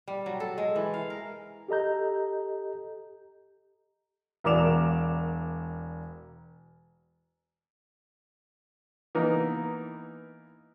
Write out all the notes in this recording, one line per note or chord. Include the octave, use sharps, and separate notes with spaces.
G3
F#3
A4
G#3
E3
F5
A#4
G4 A4 D#5 A#5 G6
E1 A#4 D5 D6 E7 F7
E3 A#3 B3 D#4